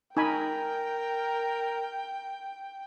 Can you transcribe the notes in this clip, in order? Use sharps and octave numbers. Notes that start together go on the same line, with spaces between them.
D#4 A#4 G5 G#5 B5